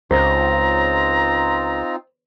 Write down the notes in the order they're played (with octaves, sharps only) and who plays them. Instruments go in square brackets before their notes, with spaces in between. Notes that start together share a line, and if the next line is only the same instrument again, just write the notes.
[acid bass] C#2 [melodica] C4 D#4 F4 [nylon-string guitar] C5 [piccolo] A#5